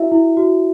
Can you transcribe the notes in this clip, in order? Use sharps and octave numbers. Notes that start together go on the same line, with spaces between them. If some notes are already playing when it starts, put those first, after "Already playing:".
Already playing: E4 F#4 E5
E4
F#4